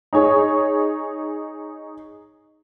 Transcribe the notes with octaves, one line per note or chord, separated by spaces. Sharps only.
D#4 G#4 C#5